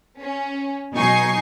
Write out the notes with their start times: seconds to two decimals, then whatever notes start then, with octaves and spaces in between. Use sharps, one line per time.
0.21 C#4
0.95 B2 F#3 D#4 G#5 C#6 C7